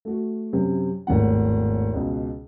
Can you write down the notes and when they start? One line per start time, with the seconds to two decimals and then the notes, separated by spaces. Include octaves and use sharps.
0.05 A3 F#4
0.53 F#2 C3
1.07 G#1 D#2 A2 F#5
1.94 C#2 B2